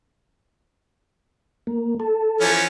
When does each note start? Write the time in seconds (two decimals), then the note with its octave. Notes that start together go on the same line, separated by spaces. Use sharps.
1.67 A#3
2.00 A4
2.41 E3 F3 C#4